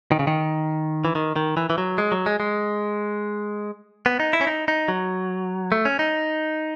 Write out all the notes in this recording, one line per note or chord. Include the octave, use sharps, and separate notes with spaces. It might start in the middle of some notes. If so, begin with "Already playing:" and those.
D#3
C#3
D#3
E3
D#3
D#3
E3
E3
F#3
G#3
F#3
G#3
G#3
B3
D#4
E4
C#4
D#4
D#4
F#3
A3
C#4
D#4